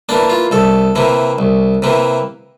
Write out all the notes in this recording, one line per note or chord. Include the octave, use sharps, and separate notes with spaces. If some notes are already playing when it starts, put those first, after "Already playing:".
E3 A#3 D4
F4
C2 A4
C3 E3 A#3
C2
C3 E3 A#3